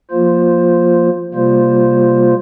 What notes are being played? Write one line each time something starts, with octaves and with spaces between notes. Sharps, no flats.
F3 A#3 F4 C5
C3 G3 A#3 F4 C5